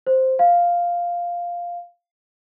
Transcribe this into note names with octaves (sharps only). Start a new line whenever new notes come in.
C5
F5